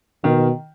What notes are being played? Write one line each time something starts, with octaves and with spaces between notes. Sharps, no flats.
B2 D#3